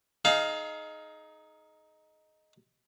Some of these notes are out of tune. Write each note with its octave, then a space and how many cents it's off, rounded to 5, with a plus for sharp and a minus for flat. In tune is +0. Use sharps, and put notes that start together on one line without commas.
D#4 +0 G#4 +35 F5 +0